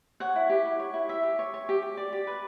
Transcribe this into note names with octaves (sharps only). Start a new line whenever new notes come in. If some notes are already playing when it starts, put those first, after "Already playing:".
C#5 F#5
E4
G4
E4
C#5
E4
G4 E5
G4
C#5
C#5
G4
G4
D5
G4
B4